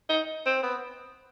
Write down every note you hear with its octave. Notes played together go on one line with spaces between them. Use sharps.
D#4
C4
B3